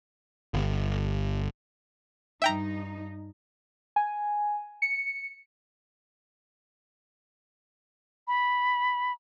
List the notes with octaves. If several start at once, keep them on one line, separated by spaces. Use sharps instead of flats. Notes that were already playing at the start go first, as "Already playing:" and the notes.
G1
G2 D#4 E5 G5 A#5
G#5
C#7
B5